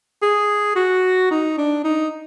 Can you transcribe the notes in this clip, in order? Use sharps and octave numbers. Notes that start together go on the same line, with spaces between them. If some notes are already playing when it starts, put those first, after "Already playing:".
G#4
F#4
D#4
D4
D#4